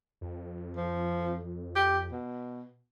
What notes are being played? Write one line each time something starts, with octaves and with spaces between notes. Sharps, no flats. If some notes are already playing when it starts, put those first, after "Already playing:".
F2
F3
G4
B2